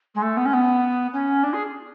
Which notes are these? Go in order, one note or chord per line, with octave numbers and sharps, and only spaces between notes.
G#3
A3
B3
C#4
B3
C#4
D4
G#4